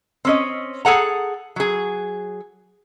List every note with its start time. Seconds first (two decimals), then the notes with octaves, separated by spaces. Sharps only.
0.25 C4 C#4 D#5
0.85 G#4 A4 F#5 A#5
1.56 F#3 G#4